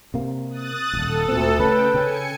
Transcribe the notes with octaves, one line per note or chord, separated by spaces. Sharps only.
C3 A#3
D#6 F#6 A6
D#1 C2 A4
D2 A#2 C4
C#3 A3 C#4 B4 G5
C#3 C#4 G#5 C#7